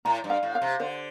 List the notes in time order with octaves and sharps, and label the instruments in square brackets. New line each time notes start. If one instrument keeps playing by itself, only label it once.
[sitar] A2 [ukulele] A#5
[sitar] G2
[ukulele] F5
[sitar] A2
[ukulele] F5
[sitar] C3
[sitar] D3 [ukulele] C5